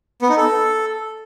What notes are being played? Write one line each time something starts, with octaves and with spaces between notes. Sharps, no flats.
B3
D#4
A4